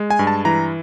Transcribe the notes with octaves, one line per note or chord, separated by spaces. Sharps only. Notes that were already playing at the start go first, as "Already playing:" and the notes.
Already playing: G#3
G#5
G2
A5
E3 A#5